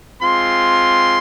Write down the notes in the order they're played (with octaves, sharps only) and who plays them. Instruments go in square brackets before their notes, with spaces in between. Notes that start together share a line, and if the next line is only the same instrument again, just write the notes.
[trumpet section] G#3 C4 F4 C6